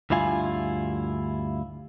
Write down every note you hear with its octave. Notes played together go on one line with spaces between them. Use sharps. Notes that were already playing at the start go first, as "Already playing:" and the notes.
D2 G2 E4 F4 G#5